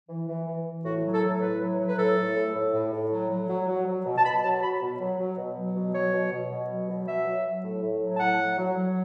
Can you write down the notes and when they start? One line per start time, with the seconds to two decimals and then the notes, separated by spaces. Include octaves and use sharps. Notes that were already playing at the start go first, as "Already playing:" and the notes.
0.09 E3
0.28 E3
0.47 E3
0.66 E3
0.84 A2 F#4
1.04 F#3
1.13 A4
1.22 A2
1.42 A2 B4
1.60 F#3
1.79 F#3
1.88 B4
1.98 A2 A4
2.17 A2
2.35 A2
2.55 A2
2.73 A2
2.92 A2
3.12 F#3
3.30 F#3
3.49 F#3
3.68 F#3
3.87 F#3
4.05 B2
4.18 A5
4.24 B2 B5
4.43 F#3 A5
4.62 F#3 B5
4.81 B2
5.00 F#3
5.19 F#3
5.38 B2
5.56 F#3
5.76 B2
5.94 F#3 C#5
6.13 B2
6.32 B2
6.51 B2
6.70 F#3
6.89 B2
7.08 F#3 E5
7.26 F#3
7.45 F#3
7.63 A2
7.82 A2
8.02 F#3
8.16 A5
8.20 A2 F#5
8.39 F#3
8.58 F#3
8.77 F#3